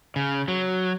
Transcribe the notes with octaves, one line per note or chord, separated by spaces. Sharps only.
C#3
F#3